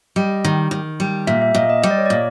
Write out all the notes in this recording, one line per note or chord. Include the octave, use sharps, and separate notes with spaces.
G3 D#5
D#3
D#3
G3
A#2 E5
E5
A#2 D#5
D#5
G3 D#5
D5
C#5
A#2 D5